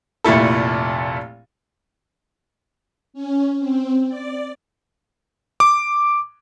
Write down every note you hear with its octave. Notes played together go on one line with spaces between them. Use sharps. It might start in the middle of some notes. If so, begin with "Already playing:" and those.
F1 A#2 A3 E4 A4
C#4
C4
D5
D6